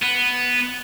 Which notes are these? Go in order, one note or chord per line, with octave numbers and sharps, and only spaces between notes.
B3